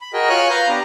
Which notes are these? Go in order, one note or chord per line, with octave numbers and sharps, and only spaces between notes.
B5
F#4 G#4 A#4 D#5 G5
F4 C#5 G#5 F6 F#6
B4 F5 A#5 F6 G6
B3 D4 G4 A#5